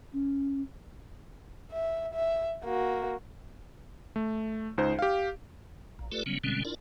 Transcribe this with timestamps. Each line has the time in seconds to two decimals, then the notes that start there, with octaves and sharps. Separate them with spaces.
0.13 C#4
1.72 E5
2.14 E5
2.64 A#3 F#4
4.16 A3
4.78 C#2 D#4 C5
4.99 G4 F5
5.99 A#1
6.12 A3 F4 G4 A4 B4 D5
6.26 C#3 F#3 G3 B3 C#4
6.44 B2 D3 G3 G#3 C4 C#4
6.65 D4 E4 F4 A#4 D5